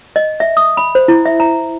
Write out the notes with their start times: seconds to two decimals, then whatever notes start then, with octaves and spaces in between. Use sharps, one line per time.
0.16 D#5
0.40 E5
0.57 D#6
0.77 B5
0.95 C5
1.08 E4
1.25 E5
1.40 A#5